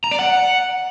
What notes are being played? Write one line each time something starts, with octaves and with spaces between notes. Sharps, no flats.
A#5
D5
F#5